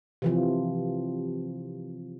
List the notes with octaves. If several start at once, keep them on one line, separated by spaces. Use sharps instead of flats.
C3 E3 F3